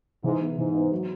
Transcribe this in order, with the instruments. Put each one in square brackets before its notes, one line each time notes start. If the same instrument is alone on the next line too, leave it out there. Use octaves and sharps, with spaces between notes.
[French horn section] G#2 [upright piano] E3
[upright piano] B3 E4
[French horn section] G#2 [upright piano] E3
[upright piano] B3 E4
F#3